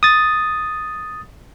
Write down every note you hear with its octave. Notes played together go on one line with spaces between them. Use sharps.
D#6 A6